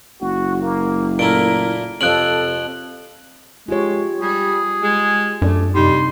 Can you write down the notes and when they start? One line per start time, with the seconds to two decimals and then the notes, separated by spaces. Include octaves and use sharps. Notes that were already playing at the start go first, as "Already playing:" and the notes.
0.21 F#1 F#4
0.62 A#3
1.19 A#2 A3 E4 A#4 D7
2.01 F2 C3 F3 C#4 A4 F#6 D7 F#7
3.68 G#3 F4 G4 C#5
4.21 G3 G#4
4.83 G#3
5.42 F#2 A3 D4 D5
5.75 C3 G3 D#4 C6